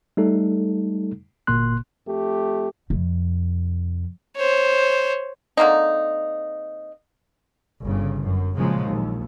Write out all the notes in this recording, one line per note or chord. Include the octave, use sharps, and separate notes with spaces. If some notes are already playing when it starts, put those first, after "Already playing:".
G3 A3 D#4 A4
G1 A#2 A#3 C6 F#6
F2 A3 G4
F2 C3
C5 C#5
D3 A#3 C4 D#4
G1 C#3
F#2
A#2 C#3 F3 F#3 G#3
A#1 D#2